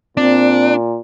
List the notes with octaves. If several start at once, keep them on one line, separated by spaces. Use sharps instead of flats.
A#2 C4 D4